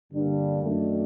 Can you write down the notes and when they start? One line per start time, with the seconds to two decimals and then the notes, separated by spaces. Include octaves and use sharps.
0.12 G2 D3 G3 A#3 D4
0.63 F#2 D#3 A3 D4